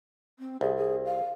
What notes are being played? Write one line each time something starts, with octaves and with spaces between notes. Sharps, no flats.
C4
C2 G#4
G#4
F5